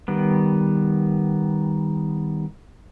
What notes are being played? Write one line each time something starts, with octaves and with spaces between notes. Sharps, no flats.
D#3 G3 B3